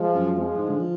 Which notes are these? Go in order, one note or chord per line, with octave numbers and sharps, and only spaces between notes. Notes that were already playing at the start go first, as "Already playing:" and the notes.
Already playing: F3 G#3
F#2
F2 F3 G#3
G#2
D3
F3